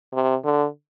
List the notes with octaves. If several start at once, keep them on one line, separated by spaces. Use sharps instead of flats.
C3
D3